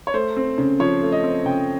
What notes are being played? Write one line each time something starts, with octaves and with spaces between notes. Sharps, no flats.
C#5
A3 C5
C4
C#3
F3 C#5
A3
D#5
C4
C#3 G5